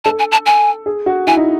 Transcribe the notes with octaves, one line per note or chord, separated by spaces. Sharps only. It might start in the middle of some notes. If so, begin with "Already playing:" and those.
A4 A5
G#5
A5
G#5
G#4
F#4
E4 G#5
D#4